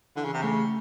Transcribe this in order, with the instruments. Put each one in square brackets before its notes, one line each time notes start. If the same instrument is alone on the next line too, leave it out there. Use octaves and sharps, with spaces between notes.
[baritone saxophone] D3 [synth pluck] E3
[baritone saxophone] C#3
C3
[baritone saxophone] C#3 [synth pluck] A3